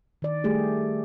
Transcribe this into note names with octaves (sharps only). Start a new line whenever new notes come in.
D#3 D5
G3 A3 G4 G#4